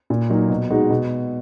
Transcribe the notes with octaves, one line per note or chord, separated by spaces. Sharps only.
A#2
F#3 A#3 D#4
B2
G#3 D#4 F#4
B2